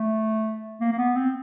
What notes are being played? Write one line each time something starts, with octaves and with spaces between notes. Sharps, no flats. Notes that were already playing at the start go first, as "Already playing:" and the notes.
Already playing: A3
A#3
A#3
B3
C4